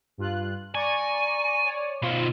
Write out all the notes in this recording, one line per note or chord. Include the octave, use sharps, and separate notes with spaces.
G2 F4 F#6
D5 G#5 A#5 C#6
C#5 D5
B2 D#4 F4 C5